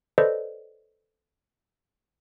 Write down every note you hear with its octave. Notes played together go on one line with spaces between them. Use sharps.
A4 B4 C5 D5 D#5